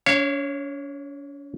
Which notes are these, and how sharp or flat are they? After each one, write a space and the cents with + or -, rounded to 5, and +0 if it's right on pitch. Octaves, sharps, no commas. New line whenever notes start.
C#4 +45 C#5 -10 F5 -40